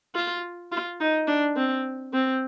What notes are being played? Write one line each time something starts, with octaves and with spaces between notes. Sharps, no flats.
F4
F4
D#4
D4
C4
C4